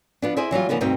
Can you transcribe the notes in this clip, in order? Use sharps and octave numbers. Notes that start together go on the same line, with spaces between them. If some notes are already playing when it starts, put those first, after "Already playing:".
F3 B3 D4
E4 G#4 C5 D5 D#5
E3 F#3 G3 F4
C#3 F3 A#3 B3 D#4
D2 G2 B2 C4 D#4 G5